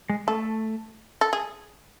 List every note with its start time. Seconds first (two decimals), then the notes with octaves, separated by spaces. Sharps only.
0.09 G#3
0.27 A3 A4
1.21 A4
1.33 G#4